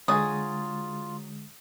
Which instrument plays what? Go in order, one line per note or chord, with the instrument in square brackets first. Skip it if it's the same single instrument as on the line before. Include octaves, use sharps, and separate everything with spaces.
[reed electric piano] D3 G#3 A6 [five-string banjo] F#3 F#4 G#4 [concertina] F4 [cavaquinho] D#6